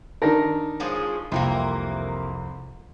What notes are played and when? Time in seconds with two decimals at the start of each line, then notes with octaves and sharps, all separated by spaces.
0.22 D#3 D4 A#4 A5 A#6
0.80 F3 G#3 C#4
1.32 C2 F2 C3 E3 A#3 C6